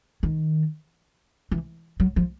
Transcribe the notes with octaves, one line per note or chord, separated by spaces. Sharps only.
D#3
E3
F#3
F3